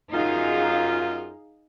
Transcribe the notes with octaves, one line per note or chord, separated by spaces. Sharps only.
F#2 D#4 F4 G#4 F5